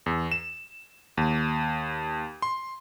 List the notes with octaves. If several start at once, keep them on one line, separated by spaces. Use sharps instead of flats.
E2
E7
D#2
C6